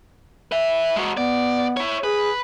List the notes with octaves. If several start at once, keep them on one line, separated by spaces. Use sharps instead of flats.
B4 E5
G#3 F#4
B3 D5
E4 C#5
G#4 B4